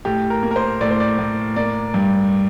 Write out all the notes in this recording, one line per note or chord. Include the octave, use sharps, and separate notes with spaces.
A2 G4
A#4
A#3
A#4
C5
A2 D5
C5
D5
A2
A#3 D5
G2